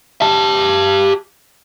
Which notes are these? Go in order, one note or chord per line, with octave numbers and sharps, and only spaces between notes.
G4 A5